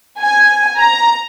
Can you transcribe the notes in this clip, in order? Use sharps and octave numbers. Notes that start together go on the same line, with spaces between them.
G#5
A#5